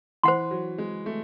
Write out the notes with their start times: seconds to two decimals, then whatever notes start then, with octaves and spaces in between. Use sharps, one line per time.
0.23 E3 C5 F#5 C6
0.51 F#3
0.78 G#3
1.06 A3